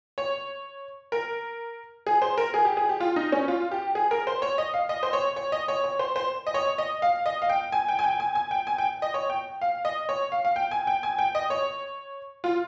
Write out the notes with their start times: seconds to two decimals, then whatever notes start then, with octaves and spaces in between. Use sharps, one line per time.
0.18 C#5
1.12 A#4
2.07 G#4
2.22 C5
2.38 A#4
2.54 G#4
2.65 G4
2.77 G#4
2.89 G4
3.00 F4
3.16 D#4
3.32 C#4
3.48 F4
3.71 G4
3.95 G#4
4.11 A#4
4.27 C5
4.42 C#5
4.58 D#5
4.74 F5
4.89 D#5
5.03 C5
5.13 C#5
5.36 C#5
5.52 D#5
5.68 C#5
5.84 C#5
5.99 C5
6.16 C5
6.47 D#5
6.54 C#5
6.78 D#5
7.02 F5
7.26 D#5
7.42 F5
7.49 G5
7.72 G#5
7.88 G5
7.99 G#5
8.04 G5
8.20 G#5
8.35 G#5
8.51 G5
8.67 G#5
8.78 G5
9.02 D#5
9.14 C#5
9.30 G5
9.62 F5
9.85 D#5
10.09 C#5
10.32 F5
10.45 F5
10.56 G5
10.71 G#5
10.87 G5
11.03 G#5
11.19 G5
11.35 D#5
11.50 C#5
12.44 F4